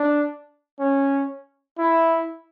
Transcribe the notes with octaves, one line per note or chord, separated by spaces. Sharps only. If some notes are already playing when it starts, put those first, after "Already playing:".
Already playing: D4
C#4
E4